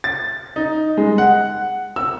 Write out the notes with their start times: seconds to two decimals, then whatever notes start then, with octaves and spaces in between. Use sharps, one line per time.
0.04 A6
0.56 D#4
0.97 G#3
1.18 F#5
1.96 E6